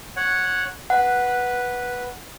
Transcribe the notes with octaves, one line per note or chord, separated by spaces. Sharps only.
C#5 F#5
B4 F#5